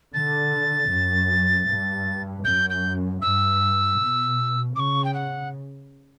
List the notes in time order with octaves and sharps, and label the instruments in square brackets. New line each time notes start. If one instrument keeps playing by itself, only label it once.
[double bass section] D3 [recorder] A6
[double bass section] F#2
G2
[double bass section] F#2 [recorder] G6
[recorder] G6
[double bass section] G2 [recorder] E6
[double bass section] B2
[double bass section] C#3 [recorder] D6
[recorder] C#6
G5
F#5